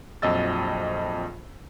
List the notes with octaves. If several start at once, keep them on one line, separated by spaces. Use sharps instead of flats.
A#1 F2 F#3 D#5 E6 A6